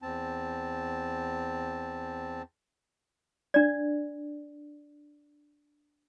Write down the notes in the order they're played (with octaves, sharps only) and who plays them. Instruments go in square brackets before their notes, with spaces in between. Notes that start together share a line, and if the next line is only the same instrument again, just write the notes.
[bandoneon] E2 C4 A5
[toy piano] D4 D5